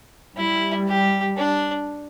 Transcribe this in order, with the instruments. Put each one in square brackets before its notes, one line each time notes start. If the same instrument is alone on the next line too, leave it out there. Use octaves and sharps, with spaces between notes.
[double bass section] G3 [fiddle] E4
[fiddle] G4
D4